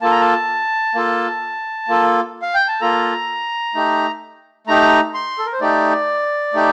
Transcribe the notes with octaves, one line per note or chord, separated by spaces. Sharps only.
A#3 F4 A4 A5
A#5
A5
A#3 F4 A4
A#3 F4 A4
F5
G5
A5
A#3 F4 A4 A#5
A3 D#4 G4
A3 D#4 G4 A#5
C6
A4
A#4
C5
A3 D#4 G4 D5
A3 D#4 G4